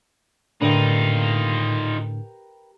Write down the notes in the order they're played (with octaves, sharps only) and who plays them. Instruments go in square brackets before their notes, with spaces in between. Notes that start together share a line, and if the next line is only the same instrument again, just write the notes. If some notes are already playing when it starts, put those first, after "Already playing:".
[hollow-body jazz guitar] A2 D3 D4 [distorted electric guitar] D#4 F4 [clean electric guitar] G4 A#4 B4